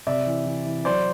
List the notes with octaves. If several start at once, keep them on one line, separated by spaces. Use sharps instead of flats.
C3 D5 E5
E3
E3
E3
F#3 C5 D5